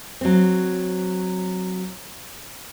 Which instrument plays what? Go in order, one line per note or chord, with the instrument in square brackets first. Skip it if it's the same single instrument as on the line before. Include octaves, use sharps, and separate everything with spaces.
[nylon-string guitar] F#3 C4